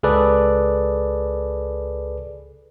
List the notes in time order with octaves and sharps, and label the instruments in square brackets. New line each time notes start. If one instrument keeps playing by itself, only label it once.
[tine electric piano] C#2 G#4 A4 B4 D5